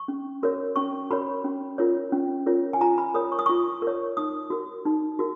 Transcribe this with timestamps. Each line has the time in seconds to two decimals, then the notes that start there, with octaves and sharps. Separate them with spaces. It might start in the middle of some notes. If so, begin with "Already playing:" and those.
Already playing: C#6
0.08 C#4
0.43 F#4 A#4 C#5
0.76 C#4 C#6
1.11 F#4 A#4 C#5 B5
1.44 C#4
1.78 F4 A#4 C#5
2.12 C#4
2.46 F4 A#4 C#5
2.73 G#5
2.81 F4 A#5
2.98 B5
3.14 A#4 C#5 D#6
3.32 C#6
3.39 D#6
3.46 F4 C#6
3.82 A#4 C#5
4.17 D#4 D#6
4.50 F#4 A#4
4.85 D#4
5.19 F#4 A#4